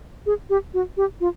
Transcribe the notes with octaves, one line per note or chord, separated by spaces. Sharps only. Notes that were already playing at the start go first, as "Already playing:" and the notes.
G#4
G4
F#4
G4
F4